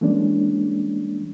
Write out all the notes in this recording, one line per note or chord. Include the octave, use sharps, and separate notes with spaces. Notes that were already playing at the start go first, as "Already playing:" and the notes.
E3 G3 G#3 A#3 C#4 D4